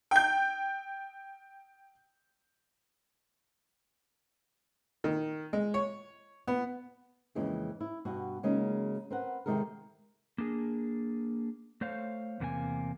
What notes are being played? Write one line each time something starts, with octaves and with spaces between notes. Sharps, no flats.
G5 G6
D#3
G#3
C#5
B3
F2 C#3 E3 G#3 A#3 E4
E4
G2 B2 F#4
C#3 F#3 G#3 A#3 C#4 D#4
C4 A#4 B4 F#5
C3 D#3 G#3 A4 A#4
A#3 D4 G#4
A3 C5 C#5 F5
E2 C3 A#3 D4 G#5